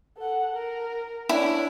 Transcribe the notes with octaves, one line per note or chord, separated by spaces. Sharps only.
A4 F#5
A#4
C#4 D4 E4